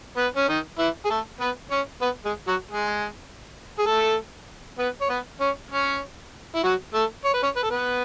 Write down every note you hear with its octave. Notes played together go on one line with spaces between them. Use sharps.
B3 B4
C#4
D#3 D#4
E3 E4
G#4
A3 A4
B3 B4
C#4 C#5
B3 B4
G#3 G#4
F#3 F#4
G#3 G#4
G#4
A3 A4
B3 B4
C#5
B3 B4
C#4 C#5
C#4 C#5
E4
F#3 F#4
A3 A4
C#5
B4
C#4 C#5
B4
A4
B3 B4